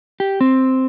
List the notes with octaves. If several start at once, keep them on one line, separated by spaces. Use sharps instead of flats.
G4
C4